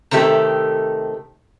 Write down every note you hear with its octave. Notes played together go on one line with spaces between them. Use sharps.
C3 D#3 A3 G4